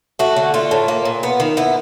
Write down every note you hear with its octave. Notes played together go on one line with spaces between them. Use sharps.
A3 F#4
D3
A3 F4
A2
A#3
A#2
B3
D#3
B3 E4